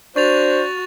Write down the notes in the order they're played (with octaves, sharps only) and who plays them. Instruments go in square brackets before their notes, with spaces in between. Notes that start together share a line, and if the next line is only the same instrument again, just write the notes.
[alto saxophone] D4 [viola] F#4 [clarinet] C5 [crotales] C#6 A6 F7